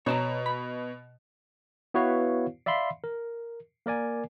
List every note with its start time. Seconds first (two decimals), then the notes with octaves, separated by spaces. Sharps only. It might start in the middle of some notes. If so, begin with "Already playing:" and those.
0.06 B2 C#5 A5 A#5
0.46 B5
1.94 B3 E4 F#4 B4 C#5 F5
2.66 D5 E5 F5 B5 C6
3.04 A#4
3.86 A#3 A#4 D5 G#5